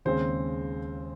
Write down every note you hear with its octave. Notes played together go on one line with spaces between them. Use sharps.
D#2 C#3 G#3 C4 C5